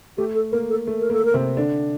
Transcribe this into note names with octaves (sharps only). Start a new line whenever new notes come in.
A3 G4
A4
A#3 A#4
A4
A3
A#4
A#3 A4
A#4
C3 C4
D3 D4